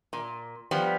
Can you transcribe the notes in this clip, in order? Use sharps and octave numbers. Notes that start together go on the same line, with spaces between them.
A#2
F3 G3 B3